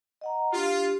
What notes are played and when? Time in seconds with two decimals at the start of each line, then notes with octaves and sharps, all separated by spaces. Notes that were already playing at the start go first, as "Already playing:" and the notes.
0.21 D#5 F#5 A#5
0.52 D4 F4 G4